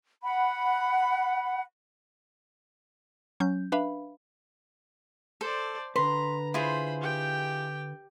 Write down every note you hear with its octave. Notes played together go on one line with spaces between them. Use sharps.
F#5 B5
F#3 C#4 G6
D4 B4 E5 F5 B5
A4 C5 D5
D3 B4 A#5 C6
E4 F4 G#4 C5 B5
G4 G5